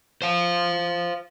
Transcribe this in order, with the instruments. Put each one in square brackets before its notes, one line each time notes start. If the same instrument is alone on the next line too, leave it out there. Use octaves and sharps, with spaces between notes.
[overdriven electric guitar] C5 F5